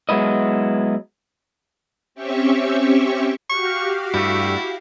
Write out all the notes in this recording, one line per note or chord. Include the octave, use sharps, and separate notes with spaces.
F#3 G#3 B3 E4 D#5
C4 C#4 G4 E5 C#6
F#4 G4 F5 C#6
G2 A3 E4